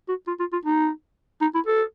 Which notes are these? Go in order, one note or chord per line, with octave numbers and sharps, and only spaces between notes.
F#4
F4
F4
F4
D#4
D#4
E4
A4